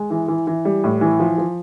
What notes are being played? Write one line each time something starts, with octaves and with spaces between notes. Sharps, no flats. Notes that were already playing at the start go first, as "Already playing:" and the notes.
Already playing: G#3
E3
E3
E3
G3
A2
E3
F3
F3